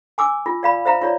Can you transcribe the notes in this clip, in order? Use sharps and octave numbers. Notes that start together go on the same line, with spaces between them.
G#5 D6 E6
F4
D5 F5 B5
C5 E5 F5 A#5
F4 C#5 D5